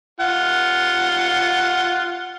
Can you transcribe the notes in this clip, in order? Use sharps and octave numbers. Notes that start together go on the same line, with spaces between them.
F4 F#5